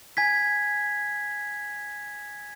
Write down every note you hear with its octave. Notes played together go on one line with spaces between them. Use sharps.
G#5 G#6 B6